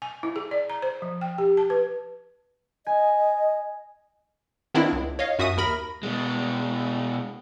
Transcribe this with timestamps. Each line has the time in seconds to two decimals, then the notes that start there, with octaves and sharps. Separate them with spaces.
0.02 G#5
0.23 E4
0.36 G#4
0.51 D5
0.70 A#5
0.82 C5
1.02 F3
1.21 G5
1.38 G4
1.57 A5
1.70 B4
2.87 D#5 G#5
4.75 D#3 B3 C4 D4 E4 F4
4.92 C#2
5.19 C#5 D#5 F5
5.39 F#2 F#4 E5 D#6 D#7
5.57 D#2 A#4 B5 A#6
6.03 B2 G#3